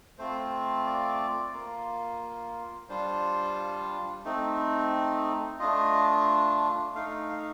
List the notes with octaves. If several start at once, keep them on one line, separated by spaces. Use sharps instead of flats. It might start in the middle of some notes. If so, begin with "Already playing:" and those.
A3 C4 F4 C5
D5
A#3 F4
G3 D4 F4 C5
A3 C4 D#4
A3 D4 F4 D#5
A3 D#4 F5
F5